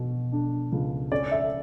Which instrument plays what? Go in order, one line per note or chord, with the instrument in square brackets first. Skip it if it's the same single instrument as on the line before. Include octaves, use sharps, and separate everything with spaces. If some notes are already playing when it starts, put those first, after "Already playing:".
Already playing: [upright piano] B2
D4
C#2
C#4 D5
E5